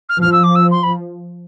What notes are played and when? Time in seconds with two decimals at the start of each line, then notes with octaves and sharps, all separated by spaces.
0.09 F6
0.21 F3 F6
0.32 E6
0.43 D6
0.55 E6
0.71 C6
0.83 B5